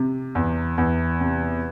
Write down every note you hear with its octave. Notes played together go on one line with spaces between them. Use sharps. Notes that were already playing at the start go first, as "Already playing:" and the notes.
Already playing: C3
E2
E2
C3